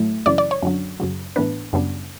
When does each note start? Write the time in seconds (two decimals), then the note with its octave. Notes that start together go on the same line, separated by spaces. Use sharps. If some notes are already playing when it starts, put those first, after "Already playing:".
Already playing: A2 F#3 A3 E4
0.26 F#2 C#3 E3 D5
0.38 D5
0.51 C#5
0.63 F#2 D3 F#3
1.00 F#2 C#3 F#3
1.36 A2 E3 B3 D4 B4
1.73 F#2 C#3 G3 B3 D4